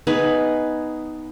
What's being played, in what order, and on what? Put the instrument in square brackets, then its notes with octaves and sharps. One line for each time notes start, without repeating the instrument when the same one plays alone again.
[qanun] B3 D#4 G#4 B4